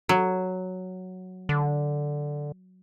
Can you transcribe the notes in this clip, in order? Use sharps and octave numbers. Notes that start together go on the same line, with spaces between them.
F#3
D3